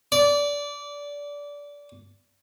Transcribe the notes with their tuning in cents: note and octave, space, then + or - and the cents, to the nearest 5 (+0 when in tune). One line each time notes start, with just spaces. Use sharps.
D5 -20